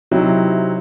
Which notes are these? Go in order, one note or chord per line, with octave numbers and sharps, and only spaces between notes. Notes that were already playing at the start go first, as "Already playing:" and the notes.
C3 F#3 C4 D#4 E4 C5